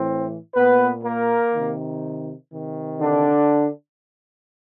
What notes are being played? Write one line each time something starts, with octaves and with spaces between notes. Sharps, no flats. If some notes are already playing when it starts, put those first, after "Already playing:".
Already playing: A2 E3 C4
A#2 B3 B4
A#3 A#4
C3 D#3
C3 D#3
D3 D4